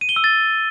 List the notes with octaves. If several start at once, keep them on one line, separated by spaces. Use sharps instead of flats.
D#7
G7
E6
A6